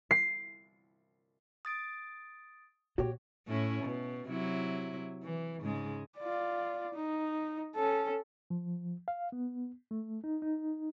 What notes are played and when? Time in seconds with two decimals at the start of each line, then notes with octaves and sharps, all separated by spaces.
0.11 C7
1.65 D#6 A6 D7
2.98 A#2 F#4 G4 C#5
3.47 A2 C#4 E4
3.84 B2
4.29 C3 F#3 E4
5.23 E3
5.61 G#2 C#3 G#3
6.18 F4 D5
6.94 D#4
7.76 C#4 A4
8.50 F3
9.08 F5
9.32 B3
9.91 A3
10.24 D#4
10.42 D#4